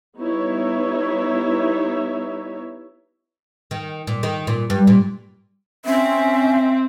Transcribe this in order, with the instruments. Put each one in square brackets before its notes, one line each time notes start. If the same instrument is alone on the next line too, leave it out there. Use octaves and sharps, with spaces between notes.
[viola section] G3 B3 D#4 E4 C#5 E5
[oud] D#3
A#2
D#3
A#2
G2
A#2
[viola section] C4 [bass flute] C#4 [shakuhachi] E5